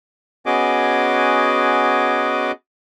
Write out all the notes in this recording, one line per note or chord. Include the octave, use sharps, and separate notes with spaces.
B3 C#4 F#4 G#4 D#5 D6